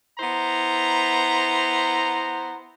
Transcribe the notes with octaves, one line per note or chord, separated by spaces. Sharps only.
B3 E4 C5 A#5